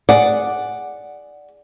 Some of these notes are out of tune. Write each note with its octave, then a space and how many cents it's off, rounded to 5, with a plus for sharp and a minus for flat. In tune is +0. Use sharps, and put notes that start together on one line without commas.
G#4 +0 D5 +0 F#5 +0